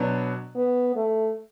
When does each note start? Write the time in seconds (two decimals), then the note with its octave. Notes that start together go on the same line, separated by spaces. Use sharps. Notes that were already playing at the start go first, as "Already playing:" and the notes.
Already playing: B2 F#3 B3 D4
0.55 B3
0.96 A3